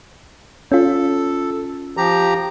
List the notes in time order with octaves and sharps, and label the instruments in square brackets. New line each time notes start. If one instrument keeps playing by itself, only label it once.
[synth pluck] C#4 F4 [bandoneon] A4
[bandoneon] F3 G4 A#5